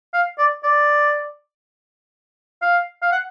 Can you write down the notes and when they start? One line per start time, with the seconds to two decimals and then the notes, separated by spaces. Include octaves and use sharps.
0.13 F5
0.38 D5
0.63 D5
2.62 F5
3.02 F5
3.12 F#5